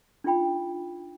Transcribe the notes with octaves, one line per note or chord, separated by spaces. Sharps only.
D4 D#4 F4 G5 B5